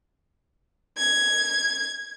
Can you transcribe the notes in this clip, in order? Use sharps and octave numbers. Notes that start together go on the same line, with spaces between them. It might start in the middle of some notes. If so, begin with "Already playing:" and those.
G#6